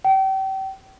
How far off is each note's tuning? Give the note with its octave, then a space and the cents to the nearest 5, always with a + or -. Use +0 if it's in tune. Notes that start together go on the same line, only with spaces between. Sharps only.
G5 -35